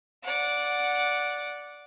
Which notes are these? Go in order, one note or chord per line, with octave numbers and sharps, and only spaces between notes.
D5 F#5